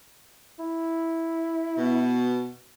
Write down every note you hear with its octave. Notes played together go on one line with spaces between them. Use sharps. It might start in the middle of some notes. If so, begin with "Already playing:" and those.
E4
B2